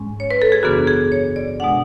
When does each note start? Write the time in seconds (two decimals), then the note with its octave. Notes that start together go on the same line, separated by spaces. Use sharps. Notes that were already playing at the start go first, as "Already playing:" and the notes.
Already playing: G#2 G#3 C#4
0.20 C#5
0.31 B4
0.42 A4
0.52 G#4
0.63 F#2 C#3 E3 B3 D4 F#4
0.87 G#4
1.12 C#5
1.36 D5
1.60 D4 F#5
1.62 B2 G#3